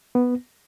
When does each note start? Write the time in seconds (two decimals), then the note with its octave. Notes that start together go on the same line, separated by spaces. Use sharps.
0.15 B3